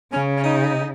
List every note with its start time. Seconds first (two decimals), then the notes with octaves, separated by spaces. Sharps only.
0.13 C#3 C#4
0.38 C#4
0.44 D#4